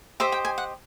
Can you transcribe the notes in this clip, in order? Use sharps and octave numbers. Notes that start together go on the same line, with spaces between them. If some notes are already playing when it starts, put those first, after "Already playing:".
G4 C5 D#5 E5
G5
G#5
F#5